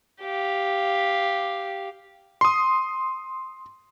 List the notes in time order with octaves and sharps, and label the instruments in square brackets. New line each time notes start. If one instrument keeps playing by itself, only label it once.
[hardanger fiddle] G4 F5
[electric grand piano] C6 D#6